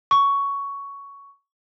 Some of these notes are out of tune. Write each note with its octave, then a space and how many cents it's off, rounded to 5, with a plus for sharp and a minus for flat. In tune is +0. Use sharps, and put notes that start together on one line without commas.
C#6 +10